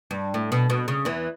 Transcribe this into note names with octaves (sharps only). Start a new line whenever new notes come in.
G2
A2
B2
B2
C#3
E2 E3